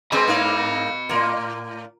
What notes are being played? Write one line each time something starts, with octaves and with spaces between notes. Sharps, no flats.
G#3 C4 B4 C5 D5 D#5 B5
G#2 A#3 D#4
A2 A#3 F4 A#4